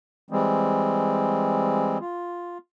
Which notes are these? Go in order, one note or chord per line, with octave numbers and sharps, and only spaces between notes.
E3 G3 G#3 C4
F4